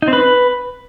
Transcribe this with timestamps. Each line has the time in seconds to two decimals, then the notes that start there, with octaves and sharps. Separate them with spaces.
0.02 D#4
0.08 C4
0.13 B4